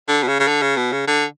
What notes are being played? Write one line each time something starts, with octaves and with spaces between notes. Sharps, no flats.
D3
B2
C#3
C#3
D3
C#3
B2
C#3
D3